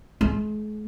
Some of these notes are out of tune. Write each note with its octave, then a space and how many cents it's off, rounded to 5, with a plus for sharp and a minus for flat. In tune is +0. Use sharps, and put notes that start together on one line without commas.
G#3 +40